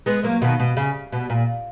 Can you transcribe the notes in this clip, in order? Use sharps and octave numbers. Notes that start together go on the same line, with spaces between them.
G#3 B3
F#3 A#3
B2 D#3
B2
C#3
B2
A#2